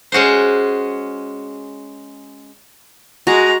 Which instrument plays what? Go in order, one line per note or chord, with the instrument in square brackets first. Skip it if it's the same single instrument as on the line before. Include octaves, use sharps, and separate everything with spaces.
[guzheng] G#3 C#4 F#4 G#4 C5
[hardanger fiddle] G#3 A#5 [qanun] F#4